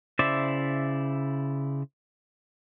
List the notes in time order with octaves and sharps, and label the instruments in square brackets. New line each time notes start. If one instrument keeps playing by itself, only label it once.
[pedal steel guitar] C#3 E4 C5 D5 E5